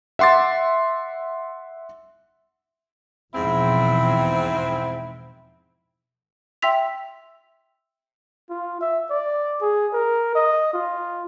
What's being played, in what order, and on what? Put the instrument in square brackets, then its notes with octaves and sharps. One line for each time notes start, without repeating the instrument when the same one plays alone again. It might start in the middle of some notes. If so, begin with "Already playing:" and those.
[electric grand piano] E5 F#5 C6 D6 A6
[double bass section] E2 B2 F3 [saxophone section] G#2 C4 [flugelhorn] E4
[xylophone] E5 G5 C6 E6 B6 F7
[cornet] F4
E5
D5
G#4
A#4
D#5
F4